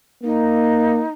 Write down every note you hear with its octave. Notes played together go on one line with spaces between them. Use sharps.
A#3 D#4